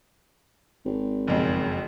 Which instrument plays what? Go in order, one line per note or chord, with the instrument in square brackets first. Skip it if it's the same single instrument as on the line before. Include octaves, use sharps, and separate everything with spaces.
[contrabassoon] G#1
[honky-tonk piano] F#1 F2